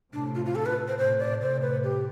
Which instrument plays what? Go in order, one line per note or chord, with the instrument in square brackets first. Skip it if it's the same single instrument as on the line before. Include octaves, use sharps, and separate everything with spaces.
[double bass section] A2 C3 [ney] D4
[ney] F4
F4
A4
B4
C5
[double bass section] A2 C3 [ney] C5
[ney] D5
[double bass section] A2 C3 [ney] C5
[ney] B4
G4